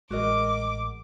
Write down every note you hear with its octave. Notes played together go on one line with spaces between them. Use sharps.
A1 G#3 F#4 A#4 D#5 D6